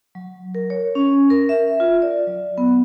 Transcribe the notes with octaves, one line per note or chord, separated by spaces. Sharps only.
F#3
A#4
C#5
C#4
A#4
E5
F4
D5
F#3
B3